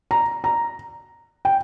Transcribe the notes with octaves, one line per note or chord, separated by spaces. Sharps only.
A#5
A#5
G5